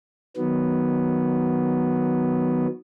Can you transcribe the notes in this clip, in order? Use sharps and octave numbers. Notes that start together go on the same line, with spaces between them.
D#3 F#3 B3